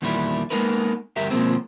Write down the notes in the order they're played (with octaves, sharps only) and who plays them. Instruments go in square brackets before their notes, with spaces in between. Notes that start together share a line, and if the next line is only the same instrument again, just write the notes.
[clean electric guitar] E2 A#2 D#3 G3 E4
G#3 A#3 B3 D#4 A#4 B4
D2 G2 G4 A#4 E5
B2 F3 G#3 A#3 C4